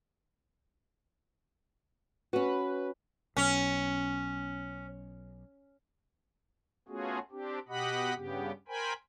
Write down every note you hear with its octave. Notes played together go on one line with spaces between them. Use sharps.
C#4 F#4 B4
B1 C#4
A3 B3 C#4 F4 F#4 G#4
C4 D4 G4
B2 G4 D#5 F#5 B5
G2 C#3 B3 G4
A#4 C5 G5 G#5 B5